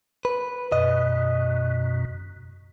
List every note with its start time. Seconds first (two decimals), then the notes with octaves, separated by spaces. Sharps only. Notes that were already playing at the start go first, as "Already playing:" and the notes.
0.25 B4
0.72 F#2 B2 D#5